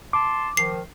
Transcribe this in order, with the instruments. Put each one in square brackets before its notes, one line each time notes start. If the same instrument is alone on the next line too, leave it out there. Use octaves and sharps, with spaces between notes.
[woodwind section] A5 C6 [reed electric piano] D6
[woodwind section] D#3 F3 [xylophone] C7